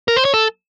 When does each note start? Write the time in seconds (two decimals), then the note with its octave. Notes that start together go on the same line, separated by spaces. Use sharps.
0.08 A#4
0.17 C5
0.25 C#5
0.34 A4